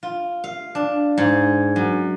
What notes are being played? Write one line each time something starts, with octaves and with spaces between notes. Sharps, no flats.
F4
F5
D4
G#2
F#2